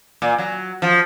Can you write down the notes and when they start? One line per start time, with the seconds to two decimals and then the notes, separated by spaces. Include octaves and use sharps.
0.22 A#2
0.38 F#3
0.82 F3